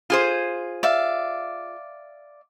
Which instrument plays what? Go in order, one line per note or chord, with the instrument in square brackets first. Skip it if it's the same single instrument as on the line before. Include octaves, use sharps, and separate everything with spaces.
[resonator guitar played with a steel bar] F4 G#4 C5
[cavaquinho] D5 E5 F5